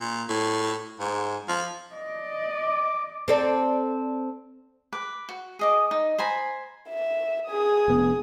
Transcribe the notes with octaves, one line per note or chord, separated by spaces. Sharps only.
A#2
A2
G#2
F3
D5 D#5
D6
C4 A4 D5
B4 D6
F#4
G#4 D#5 D6
D#4
C5 G#5 A#5 B5
E5
G#4 D#6
F1 B3